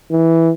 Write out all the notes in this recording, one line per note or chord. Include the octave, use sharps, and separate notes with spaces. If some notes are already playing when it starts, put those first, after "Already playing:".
E3